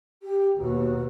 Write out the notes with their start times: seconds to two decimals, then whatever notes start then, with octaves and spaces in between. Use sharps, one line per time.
0.22 G4
0.57 D#2 B2 F#4